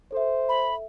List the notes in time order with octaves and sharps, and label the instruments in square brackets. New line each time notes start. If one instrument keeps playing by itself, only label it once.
[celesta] A4 E5 [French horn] C5
[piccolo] B5